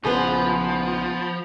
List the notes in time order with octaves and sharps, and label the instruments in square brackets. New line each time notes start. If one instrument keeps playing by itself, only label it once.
[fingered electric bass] A#1 C#3 [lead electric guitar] F3 [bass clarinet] B3 [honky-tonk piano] G#4 B4 C5